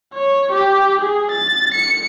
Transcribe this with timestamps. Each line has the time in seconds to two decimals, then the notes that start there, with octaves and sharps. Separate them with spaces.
0.15 C#5
0.52 G4
1.01 G#4
1.31 A6
1.74 C#7